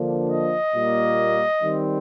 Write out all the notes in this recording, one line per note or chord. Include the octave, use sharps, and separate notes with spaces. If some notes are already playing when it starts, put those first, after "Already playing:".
Already playing: D3 F3 A#3 D4
D#5
A#2 G3 A#3
D#3 G3 C4